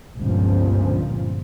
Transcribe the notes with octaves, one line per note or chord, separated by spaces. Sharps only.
G1 C#2 A#2 F3